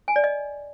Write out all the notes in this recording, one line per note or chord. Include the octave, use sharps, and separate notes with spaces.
G#5
D5
D#5